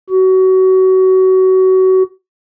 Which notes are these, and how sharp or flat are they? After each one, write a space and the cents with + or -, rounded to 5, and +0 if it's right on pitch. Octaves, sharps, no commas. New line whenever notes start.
F#4 +25